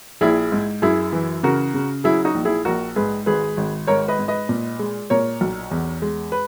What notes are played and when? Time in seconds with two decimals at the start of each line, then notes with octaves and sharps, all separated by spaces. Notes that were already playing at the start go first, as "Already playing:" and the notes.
0.21 A#1 E4 G#4
0.52 G#2
0.82 F#2 E4 G#4
1.13 E3
1.43 C#3 F#4 A#4
1.74 C#3
2.04 F#3 E4 G#4
2.25 D#4 F#4
2.35 A#1
2.45 E4 G#4
2.65 A#1 F#4 A#4
2.96 G#2 G#4 B4
3.26 G#1 G#4 B4
3.57 G#1
3.87 G#2 A#4 C#5
4.08 B4 D#5
4.19 G#2
4.28 B4 D#5
4.49 A#2
4.79 G#3
5.10 A#2 A#4 C#5
5.41 B1
5.71 E2
6.02 G#3
6.32 B4